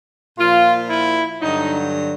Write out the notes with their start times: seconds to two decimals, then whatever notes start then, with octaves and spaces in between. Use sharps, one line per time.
0.39 A#2 F3 F4
0.89 E4
1.41 G2 D3 F#3 D#4